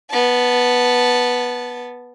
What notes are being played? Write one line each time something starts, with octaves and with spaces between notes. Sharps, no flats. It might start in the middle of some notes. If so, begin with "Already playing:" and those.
B3 A5